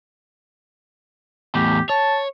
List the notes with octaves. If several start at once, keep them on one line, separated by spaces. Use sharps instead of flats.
E2 A2 G4
C#5 A5